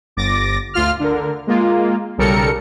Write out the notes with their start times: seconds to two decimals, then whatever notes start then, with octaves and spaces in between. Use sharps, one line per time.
0.16 G1 D6 A6 A#6
0.74 D2 F4 F6
1.00 D3 A#4
1.47 G#3 A#3 F4
2.18 B1 C#3 G3 A4 A#4 C#7